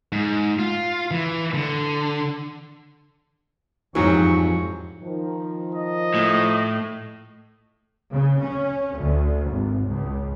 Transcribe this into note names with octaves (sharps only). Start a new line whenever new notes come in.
G#2
F4
E3
D3
F2 G#2 E3 F#3 G3 D#4 C#6
D#3 F3
D#5
A2
C#3
C#4
D2
G#1
C#2